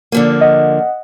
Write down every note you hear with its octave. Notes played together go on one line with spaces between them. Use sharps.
D3 F3 A#3
D#5 F#5